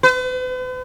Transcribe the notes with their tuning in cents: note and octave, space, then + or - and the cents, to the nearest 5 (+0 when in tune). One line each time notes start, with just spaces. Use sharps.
B4 +45